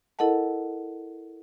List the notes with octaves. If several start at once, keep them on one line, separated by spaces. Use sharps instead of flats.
E4 A4 A#4 D#5 F#5 A5